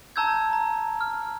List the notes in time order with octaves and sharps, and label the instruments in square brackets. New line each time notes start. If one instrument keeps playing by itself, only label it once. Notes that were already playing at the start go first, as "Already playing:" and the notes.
[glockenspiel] A5 A#5 E6 G6 G#6
A#5
F6